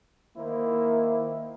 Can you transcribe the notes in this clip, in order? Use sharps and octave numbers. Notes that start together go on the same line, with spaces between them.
D#3 A#3 E4 C5